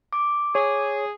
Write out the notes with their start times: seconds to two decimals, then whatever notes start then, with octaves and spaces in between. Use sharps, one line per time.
0.13 D6
0.55 G#4 C#5